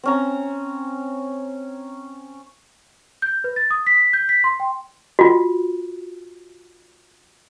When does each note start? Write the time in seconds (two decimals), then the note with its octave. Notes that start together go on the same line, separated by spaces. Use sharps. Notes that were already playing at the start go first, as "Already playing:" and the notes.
0.03 C4 C#4 A#5
3.22 G6
3.44 B4
3.56 A6
3.71 D#6
3.87 B6
4.13 G6
4.29 B6
4.44 C6
4.60 G5
5.19 F4 F#4